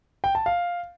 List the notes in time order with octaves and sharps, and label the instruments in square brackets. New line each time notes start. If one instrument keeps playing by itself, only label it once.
[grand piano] G5
A5
F5